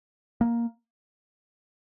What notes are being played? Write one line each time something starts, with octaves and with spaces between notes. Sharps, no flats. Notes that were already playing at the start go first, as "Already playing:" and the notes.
A#3